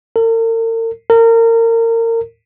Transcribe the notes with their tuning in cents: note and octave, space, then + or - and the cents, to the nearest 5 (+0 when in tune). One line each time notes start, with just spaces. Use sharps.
A#4 -45
A#4 -30